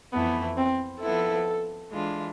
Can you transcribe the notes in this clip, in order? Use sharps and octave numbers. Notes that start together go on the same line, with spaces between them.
F2 E3 A3 B3 E4
C4
F3 B3 E4 A4
E3 G#3 D4 F4